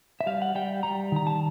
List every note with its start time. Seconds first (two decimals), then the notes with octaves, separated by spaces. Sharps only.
0.21 E5
0.26 G3 F5
0.42 F#5
0.55 G3 G5
0.83 G3 A#5
1.12 D#3 A#5
1.27 A5